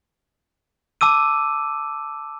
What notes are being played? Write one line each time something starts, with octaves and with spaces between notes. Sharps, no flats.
A5 D6 E6 D#7